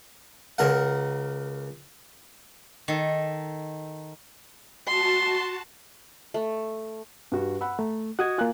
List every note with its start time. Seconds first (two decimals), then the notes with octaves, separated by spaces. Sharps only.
0.58 C#2 A#4 F#5
2.88 D#3 A4
4.88 F#4 A5 C6
6.34 A3
7.32 G2 F#4 G4
7.61 F#5 B5 E6
7.79 A3 A#5
8.19 F#4 D#5 F#5 D#6 G#6
8.38 A#3 F4 G#5 F#6